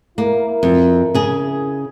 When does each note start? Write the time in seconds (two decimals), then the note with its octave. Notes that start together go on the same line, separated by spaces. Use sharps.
0.18 A#3 E4 A#4
0.63 F2
1.14 C#3 G#4